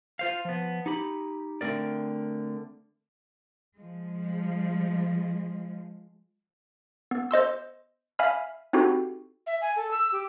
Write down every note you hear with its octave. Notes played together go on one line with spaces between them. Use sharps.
F4 C5 F5
F3 B3
D#4 G4 B5
D3 A3 C4 A#4 D5
F3 G#3
B3
C5 D#5 C6 E6
E5 F5 G#5 B5 F6
C4 D#4 E4 F#4 G4 A4
E5
G#5
A4
E6
G4